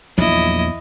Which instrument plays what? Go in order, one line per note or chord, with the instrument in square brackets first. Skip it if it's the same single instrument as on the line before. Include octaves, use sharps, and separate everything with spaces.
[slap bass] A#1 F#3 [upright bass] E2 [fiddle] E4 D#5